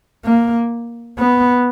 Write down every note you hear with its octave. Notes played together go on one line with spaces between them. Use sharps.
A#3
B3